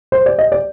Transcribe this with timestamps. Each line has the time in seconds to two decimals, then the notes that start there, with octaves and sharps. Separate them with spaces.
0.12 C5
0.26 D5
0.38 D#5
0.52 D5